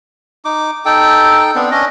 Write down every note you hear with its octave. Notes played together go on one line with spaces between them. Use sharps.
D#4 D6
D#4 A4 G5
B3 C4 D4
C#4 D4 D#5